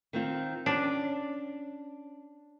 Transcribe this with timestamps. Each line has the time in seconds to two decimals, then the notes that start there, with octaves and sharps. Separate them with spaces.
0.13 D#3 C4 F4
0.66 C#4 D4